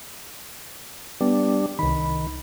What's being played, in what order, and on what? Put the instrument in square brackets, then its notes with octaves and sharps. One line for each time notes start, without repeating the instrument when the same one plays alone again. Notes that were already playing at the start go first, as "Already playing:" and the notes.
[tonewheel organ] G3 D4 [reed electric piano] B3
[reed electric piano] C2 B5 [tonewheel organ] D#3